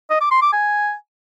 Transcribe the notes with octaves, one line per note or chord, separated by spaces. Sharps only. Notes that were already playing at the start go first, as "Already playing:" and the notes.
D#5
D6
C6
D6
G#5